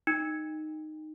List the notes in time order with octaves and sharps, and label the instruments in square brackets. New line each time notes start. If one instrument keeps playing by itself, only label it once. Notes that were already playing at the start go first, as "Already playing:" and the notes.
[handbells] D#4